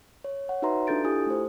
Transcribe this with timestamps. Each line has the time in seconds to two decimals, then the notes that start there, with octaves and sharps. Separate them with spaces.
0.24 C#5
0.49 C#5 F#5
0.62 D#4 F#4 B4 E5 A#5 C6
0.87 D4 F4 A4 G6 A6 D7
1.04 E4 F4 G4 A4 G#5 D#6
1.27 A3 C5